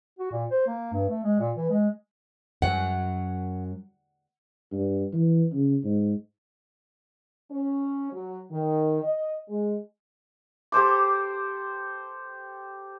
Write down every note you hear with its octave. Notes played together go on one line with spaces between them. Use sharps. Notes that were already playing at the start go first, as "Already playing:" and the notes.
F#4
A#2
C5
A#3
G2
A3
G#3
A#2
E3
G#3
F#2 F#3 F#5
G2
E3
C#3
G#2
C#4
F#3
D#3
D#5
G#3
G4 A4 C5 D6